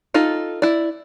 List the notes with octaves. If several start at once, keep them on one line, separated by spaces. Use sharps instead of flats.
D#4 F4 A4
E4 D5